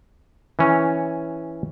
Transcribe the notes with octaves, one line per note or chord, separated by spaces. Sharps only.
E3 C#4